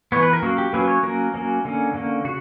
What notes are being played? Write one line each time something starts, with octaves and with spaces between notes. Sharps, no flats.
E3 B3 C#5
B4
A#4
F#3 A#3 C#4
G4
F#3 A#3 C#4 B4
C#5
F#3 A#3 C#4 A#4
F#3 A#3 C#4
D3 A#3 C#4
D3 A#3 C#4
C#3 F#4